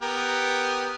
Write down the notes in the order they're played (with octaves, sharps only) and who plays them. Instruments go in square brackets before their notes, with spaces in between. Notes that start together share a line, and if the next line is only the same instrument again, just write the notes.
[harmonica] B3 G4 A#4